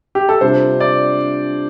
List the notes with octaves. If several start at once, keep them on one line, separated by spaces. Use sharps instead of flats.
G4
A4
C3 G3 D4 F4 C5
D5